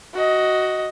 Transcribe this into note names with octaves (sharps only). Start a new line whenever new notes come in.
F#4 D#5